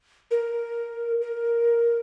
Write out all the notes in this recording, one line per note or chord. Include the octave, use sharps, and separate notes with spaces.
A#4
A#4